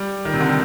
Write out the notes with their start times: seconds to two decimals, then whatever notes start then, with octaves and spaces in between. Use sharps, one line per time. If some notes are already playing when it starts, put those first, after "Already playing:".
Already playing: G3
0.25 D#3
0.34 C3
0.41 D3
0.49 G3